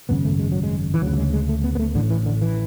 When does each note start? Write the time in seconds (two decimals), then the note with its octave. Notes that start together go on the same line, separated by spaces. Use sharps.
0.09 G#1 F#2 C#3 B3
0.25 A3
0.40 G#3
0.52 F#3
0.63 G#3
0.94 E3
1.02 D2 F#3
1.05 C#3
1.13 F#3
1.18 G#3
1.34 G#3
1.49 A3
1.64 B3
1.75 B3
1.80 A3
1.95 A1 A2 D3
2.11 E3
2.26 D3
2.42 E3